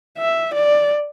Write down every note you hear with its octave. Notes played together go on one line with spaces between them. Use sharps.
E5
D5